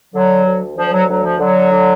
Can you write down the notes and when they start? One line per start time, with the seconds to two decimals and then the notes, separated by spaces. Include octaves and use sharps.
0.14 D3 F#3
0.46 D2
0.77 D2 F3
0.93 F#3
1.10 D2 F#3
1.24 F3
1.40 D3 F#3
1.72 D3